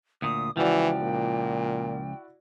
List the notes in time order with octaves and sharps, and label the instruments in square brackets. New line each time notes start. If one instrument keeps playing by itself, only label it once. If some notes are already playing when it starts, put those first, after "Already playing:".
[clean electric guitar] D2 A#2 [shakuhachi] D#6
[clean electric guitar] C#2 F3 [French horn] E3 [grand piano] E4 F#4 D5 [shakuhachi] G5
[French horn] A#2